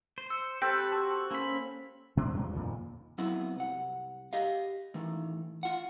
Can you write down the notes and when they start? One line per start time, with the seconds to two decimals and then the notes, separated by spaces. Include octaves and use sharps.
0.18 C5
0.30 E6 C#7
0.62 C4 G4 A4 B4 G5 G6 A#6
0.92 F#4 A5
1.31 A#3 C#4 B5
2.17 B2 G#3 C4 D4
2.34 E2 G2 F3
2.53 F2 A#2 D#3 F3
3.18 F#3 B3 C4 E4
3.56 C2 F#5
4.33 G4 D#5 F5
4.94 A2 D#3 E3
5.63 F4 F#5